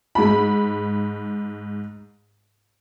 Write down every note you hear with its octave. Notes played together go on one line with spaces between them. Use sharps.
G#2 B5